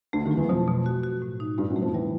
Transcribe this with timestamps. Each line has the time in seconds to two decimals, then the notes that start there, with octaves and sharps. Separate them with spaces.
0.13 D2 D3 A3
0.25 D#2 D#3
0.31 F#3
0.37 E2 E3
0.49 F2 B2 F3
0.68 B2
0.86 F#4
1.03 F#4
1.22 A2
1.40 D#4
1.58 G2 G3 A3
1.70 F#2 F#3
1.76 A3
1.82 F2 F3
1.94 E3 G3